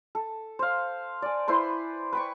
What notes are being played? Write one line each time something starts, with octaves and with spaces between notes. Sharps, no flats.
A4
C5 F5
D5 G#5
E4 B4 C5 C6
B4 G5 C#6